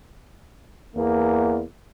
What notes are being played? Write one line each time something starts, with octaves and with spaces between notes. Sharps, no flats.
E2 A#3